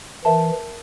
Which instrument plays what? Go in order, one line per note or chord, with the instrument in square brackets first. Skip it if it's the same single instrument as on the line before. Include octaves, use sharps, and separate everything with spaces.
[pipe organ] E3 [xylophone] A#4 E5 A5